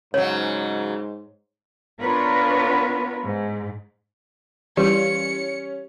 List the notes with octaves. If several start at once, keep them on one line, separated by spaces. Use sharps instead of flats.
G#2 C#3 F#3 C#5
B3 D4 F4 A#4 B4 C#5
G#2
E3 G3 C#4 F4 G4 C#7